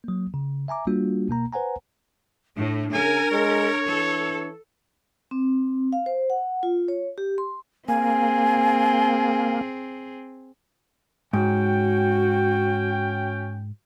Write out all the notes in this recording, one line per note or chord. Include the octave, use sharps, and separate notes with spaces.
F#3 A#3
C#3
E5 G#5 A#5 D6
G3 A#3 D4 F4 F#4
B2 A#3 A#5
B4 C5 F#5 G#5 A#5
A2 D4
C#3 A#4 G#5
G#3 C#5
E3 A4
C4
F5
C5
F#5
F4
C#5
G4
C6
A#3 C4 G#4 G#5
G#2 C#4 F#4 G5